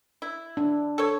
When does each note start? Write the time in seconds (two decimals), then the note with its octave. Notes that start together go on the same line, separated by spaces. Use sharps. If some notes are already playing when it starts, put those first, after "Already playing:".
0.22 E4
0.57 D4
0.98 A4 C#5